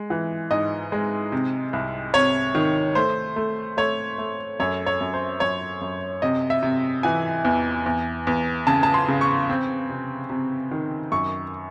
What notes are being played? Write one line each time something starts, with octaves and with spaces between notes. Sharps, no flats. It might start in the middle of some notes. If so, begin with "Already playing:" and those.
Already playing: G#3
E3
G#2 D#5
G#3
C3
C2
C3 C#5
D#3
A3 C5
A3
A3 C#5
A3
F#2 C#5
C#5
F#2
C5
F#2 C#5
F#2
C3 D#5
E5
C3
E3 G#5
E2
E2
E2
C#3 A5
A5
C6
C#3
C#6
C4
C3
C3
D#3
F#2 C#6